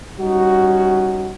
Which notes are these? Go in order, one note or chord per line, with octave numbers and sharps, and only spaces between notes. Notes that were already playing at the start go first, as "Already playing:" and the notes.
G3 C#4 D#4 F#4